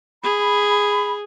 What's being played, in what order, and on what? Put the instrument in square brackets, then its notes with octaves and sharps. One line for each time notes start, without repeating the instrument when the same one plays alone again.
[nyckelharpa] G#4 [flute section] B5